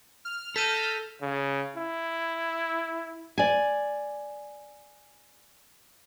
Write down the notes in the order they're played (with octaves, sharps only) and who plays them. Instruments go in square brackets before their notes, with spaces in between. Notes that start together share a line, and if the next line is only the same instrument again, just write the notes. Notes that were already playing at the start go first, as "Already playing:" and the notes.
[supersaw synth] F6
[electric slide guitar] A4 [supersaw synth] F6 G6 A#6 [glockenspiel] B6 D#7
[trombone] C#3
E4
[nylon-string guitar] D5 G#5